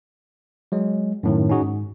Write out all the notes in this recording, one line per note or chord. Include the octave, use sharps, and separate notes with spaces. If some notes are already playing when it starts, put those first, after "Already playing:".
F#3 G#3
F#2 A2 D#3
C#4 D#4 F#4 G#4
G#2